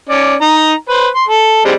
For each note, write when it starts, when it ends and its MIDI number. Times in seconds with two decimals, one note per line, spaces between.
0.09 0.35 61
0.09 0.35 74
0.41 0.72 63
0.41 0.72 82
0.89 1.07 71
0.89 1.07 72
1.15 1.24 84
1.28 1.61 69
1.65 1.73 55
1.65 1.73 56
1.65 1.73 60